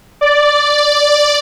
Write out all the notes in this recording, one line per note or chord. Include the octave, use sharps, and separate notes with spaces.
D5